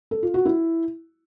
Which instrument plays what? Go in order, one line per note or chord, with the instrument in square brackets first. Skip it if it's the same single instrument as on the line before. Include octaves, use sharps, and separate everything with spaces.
[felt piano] A4
F4
F#4
E4